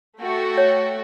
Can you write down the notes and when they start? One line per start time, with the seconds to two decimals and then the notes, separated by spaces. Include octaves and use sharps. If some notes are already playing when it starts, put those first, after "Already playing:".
0.19 A3 F#4 G5
0.57 C#5